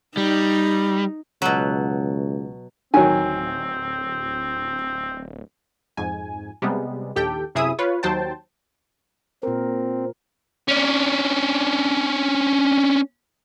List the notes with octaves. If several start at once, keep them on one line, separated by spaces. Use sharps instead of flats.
G3 D#4
C#2 B2 F#3
D1 D#3 F#3 C4 G#5
F2 G#2 G#5
C3 G3 G#3 B3
A#1 D#2 G4 A4 G5
F#2 C3 E4 G#4 E5 D#6
F4 B4 C#5
D#2 F#3 C5 G5 A5
A#2 C4 A#4
C#4 D4